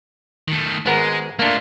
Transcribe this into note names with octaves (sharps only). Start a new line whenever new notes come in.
D#3 A3
G#1 G#3 B3 A#4
A3 A#3 D4 F4